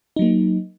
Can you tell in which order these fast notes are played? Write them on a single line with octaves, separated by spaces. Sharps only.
D#4 F#3 A#3